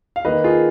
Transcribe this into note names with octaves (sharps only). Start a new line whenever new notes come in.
F5
D#3 A#3 B4 D#5
F4 G#4